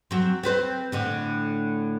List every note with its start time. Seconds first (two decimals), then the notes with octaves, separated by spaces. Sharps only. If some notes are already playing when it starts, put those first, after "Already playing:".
0.11 F#3 C4
0.43 C4 B4 C5
0.92 A2 D3 C4